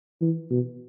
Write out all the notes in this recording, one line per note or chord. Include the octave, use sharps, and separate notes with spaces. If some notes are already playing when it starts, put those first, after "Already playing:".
E3
B2